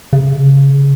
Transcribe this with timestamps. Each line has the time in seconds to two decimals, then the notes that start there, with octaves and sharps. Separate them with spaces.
0.13 C#3